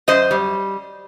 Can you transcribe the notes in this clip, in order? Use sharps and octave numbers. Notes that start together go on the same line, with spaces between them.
F#2 C5 D#5
G3